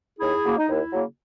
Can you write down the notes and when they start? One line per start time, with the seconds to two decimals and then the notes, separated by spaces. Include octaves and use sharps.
0.19 D#2 E4 G#4
0.44 C#3 F#3 A#3
0.58 D#4
0.68 D#2 E4
0.93 C#3 F#3 A#3